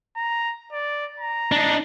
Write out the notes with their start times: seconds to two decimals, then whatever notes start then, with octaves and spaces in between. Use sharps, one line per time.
0.17 A#5
0.73 D5
1.20 A#5
1.52 D4 D#4